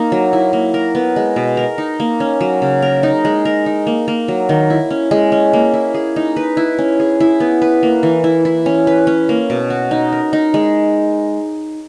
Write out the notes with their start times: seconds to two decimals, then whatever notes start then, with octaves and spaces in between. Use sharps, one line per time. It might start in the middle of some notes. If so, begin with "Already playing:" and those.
Already playing: A#3 D#4
0.12 F#3
0.33 E4
0.53 A#3
0.74 A#4
0.95 B3
1.16 G#3
1.36 B2
1.57 A#4
1.78 D#4
2.00 A#3
2.20 C#4
2.41 F#3
2.62 C#3
2.82 A#4
3.03 D#4
3.25 G#3
3.45 A#4
3.66 D#4
3.87 A#3
4.08 A#3
4.28 F#3
4.49 D#3
4.70 E4
4.91 C#4
5.11 G#3
5.32 C#4
5.53 A#3
5.74 E4
5.94 G#4
6.16 D#4
6.36 B4
6.57 E4
6.78 C#4
7.00 G#4
7.20 E4
7.40 B3
7.62 B4
7.83 A#3
8.03 E3
8.24 E4
8.45 E4
8.66 C#4
8.87 B4
9.07 C#4
9.29 A#3
9.50 B2
9.70 F#4
9.91 D#4
10.12 A#4
10.33 D#4
10.54 G#3